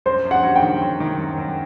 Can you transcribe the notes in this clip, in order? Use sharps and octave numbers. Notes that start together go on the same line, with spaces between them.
F#2 C5
F#2
F#5
F#3
G5
D#3
F#3
D#3
F#2
F#2